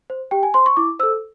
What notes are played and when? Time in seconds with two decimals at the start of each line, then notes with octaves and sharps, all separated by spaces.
0.10 C5
0.31 G4 G5
0.43 G#5
0.54 C5 C6
0.66 C#6
0.77 E4 D6
0.99 C5 E6
1.03 A4